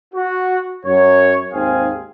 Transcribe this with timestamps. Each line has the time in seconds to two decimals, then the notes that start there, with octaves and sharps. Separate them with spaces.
0.14 F#4
0.85 F#2 C#5
1.52 D#2 G#2 C4 G#4 F5 G#5